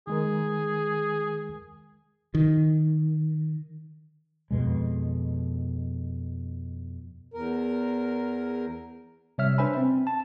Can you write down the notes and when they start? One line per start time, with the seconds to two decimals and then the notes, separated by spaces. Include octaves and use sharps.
0.07 D#3 G#3 G#4 A#4
2.35 D#3
4.51 F2 B2 G#3
7.34 E2 A#4
9.38 C3 G3 C#5 E5 F6
9.58 D4 B4 C5 E5 G#5 B5
9.77 C4
10.07 A5